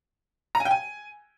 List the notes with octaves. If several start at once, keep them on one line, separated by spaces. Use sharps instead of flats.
A#5
G#5
G5
G#5